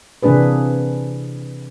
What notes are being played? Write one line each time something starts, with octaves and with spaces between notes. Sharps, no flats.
C3 E3 A#3 D4 G#4 B4